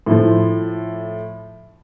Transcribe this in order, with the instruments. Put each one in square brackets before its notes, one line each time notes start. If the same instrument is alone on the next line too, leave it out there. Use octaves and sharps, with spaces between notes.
[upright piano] A2 F3